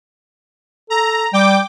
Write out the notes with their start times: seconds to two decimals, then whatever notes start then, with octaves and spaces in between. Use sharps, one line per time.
0.90 A4 A#5
1.33 G3 G5 D6